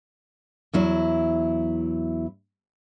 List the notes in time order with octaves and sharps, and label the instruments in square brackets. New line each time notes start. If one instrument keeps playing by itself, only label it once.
[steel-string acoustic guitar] E2 F#3 E4